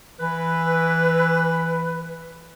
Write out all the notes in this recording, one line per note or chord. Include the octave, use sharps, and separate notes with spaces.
E3 B4